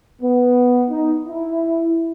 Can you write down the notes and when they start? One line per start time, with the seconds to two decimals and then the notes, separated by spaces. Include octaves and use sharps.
0.22 B3
0.89 D#4
1.27 E4